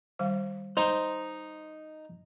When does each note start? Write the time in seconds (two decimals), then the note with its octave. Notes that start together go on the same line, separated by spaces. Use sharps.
0.19 D#3 G3 F5
0.77 D#4 C5